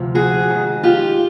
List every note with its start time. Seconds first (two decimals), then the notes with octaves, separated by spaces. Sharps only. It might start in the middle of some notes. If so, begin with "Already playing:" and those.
Already playing: D2 C3 F3
0.15 F#4 G#4
0.50 G#2 D#3
0.83 F4 G4